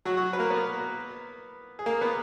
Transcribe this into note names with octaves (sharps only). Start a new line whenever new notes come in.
F#3 F#4
F#3 F#4
B4
A#3 A#4
B3 B4
G#4
A#3 A#4
B3 B4